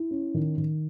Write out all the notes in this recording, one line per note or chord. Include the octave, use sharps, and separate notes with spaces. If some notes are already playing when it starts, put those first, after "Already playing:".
Already playing: E4
C#4
D#3
D#3